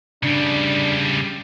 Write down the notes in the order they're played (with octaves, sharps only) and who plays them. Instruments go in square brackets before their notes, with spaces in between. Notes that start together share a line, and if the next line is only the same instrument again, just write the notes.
[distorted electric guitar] C#3 G3 [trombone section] D4